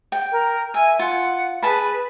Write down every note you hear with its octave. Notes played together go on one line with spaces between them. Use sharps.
G5
A#4
E5 G#5
F4 F#5
G#4 B4 A5 B5